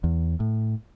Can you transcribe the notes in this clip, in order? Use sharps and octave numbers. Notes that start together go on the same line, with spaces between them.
E2
A2